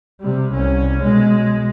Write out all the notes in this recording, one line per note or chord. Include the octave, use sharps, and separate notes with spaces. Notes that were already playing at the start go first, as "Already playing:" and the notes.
C3 G3
C2 C#4
B2 G#3